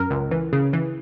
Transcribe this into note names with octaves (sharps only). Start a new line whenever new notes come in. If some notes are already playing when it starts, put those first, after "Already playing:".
Already playing: F#2 A#4
C#2
E3
C#3
E3